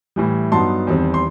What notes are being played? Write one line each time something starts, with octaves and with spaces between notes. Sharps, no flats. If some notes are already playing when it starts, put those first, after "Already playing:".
A2 E3 G3
G2 F#3 B3 D#4 A5 C6
E2 D#3 G3 C4
C6